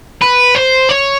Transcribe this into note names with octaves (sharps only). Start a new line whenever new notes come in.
B4
C5
C#5